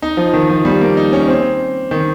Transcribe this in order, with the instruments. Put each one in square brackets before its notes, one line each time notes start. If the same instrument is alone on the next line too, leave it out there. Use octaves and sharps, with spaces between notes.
[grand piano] D#4
F3
D#3
F3
G3
A#3
D#4
C#4
C4
D#3